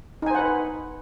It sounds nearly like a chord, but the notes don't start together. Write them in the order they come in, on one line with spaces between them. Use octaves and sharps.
D#4 G#5 C5 F#5 B4